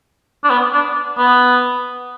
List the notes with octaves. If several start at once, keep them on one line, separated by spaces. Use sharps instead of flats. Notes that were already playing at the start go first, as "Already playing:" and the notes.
D4
B3
D4
B3